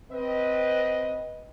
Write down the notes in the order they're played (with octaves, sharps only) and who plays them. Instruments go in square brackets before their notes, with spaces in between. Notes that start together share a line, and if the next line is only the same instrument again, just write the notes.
[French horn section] C4 B4 D#5